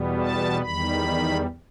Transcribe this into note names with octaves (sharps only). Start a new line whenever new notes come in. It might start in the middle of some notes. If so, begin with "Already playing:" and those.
Already playing: E2 B2 G3 B3
A5
E2 D#3 G3 B5